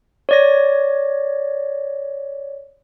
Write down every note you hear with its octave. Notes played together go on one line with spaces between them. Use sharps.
C#5 D5 A#6